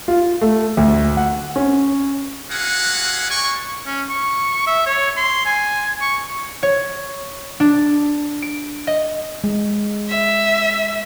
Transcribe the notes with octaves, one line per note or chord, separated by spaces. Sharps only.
F4
A3
D2
F#5
C#4
E4 F#4 G#4 F5 F#5
G#3 D5 G#5 C#6
C#4
C#6
E5
C#5
C6
G#5
C#6
C#5
D4
D7
D#5
G#3
E5